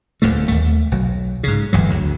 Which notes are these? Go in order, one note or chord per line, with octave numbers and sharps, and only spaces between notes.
D1 F2 D3 A3
D#2 A3
B1 F#3
G#2 C#3
G1 E2 F#3
D2